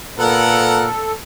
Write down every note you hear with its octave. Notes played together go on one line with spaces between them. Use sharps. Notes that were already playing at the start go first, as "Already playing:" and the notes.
A#2 B3 A4 A#4 F#5